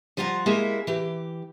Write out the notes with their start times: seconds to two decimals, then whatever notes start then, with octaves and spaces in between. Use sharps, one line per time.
0.17 F3 G3 F4 F#5 G#5 A#5
0.46 G#3 A#3 E4 G4 G#4
0.87 E3 G4